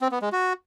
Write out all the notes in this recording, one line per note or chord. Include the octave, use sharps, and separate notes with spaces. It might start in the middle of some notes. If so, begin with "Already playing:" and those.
C4
B3
G#3
F#4